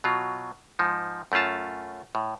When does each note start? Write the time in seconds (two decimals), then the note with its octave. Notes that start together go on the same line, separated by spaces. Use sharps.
0.04 B2 F#3 F4
0.79 G#2 F3 D#4
1.32 F#2 A3 C#4 F4 A5
2.15 A2